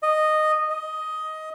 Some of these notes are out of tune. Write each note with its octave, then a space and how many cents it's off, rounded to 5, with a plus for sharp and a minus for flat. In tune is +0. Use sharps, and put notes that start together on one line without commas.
D#5 -10
D#5 +10